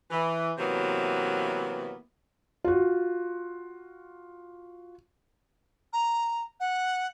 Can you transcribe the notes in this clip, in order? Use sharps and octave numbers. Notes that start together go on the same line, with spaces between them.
E3
C3 E3 F#3 A#3 B3
F4 F#4
A#5
F#5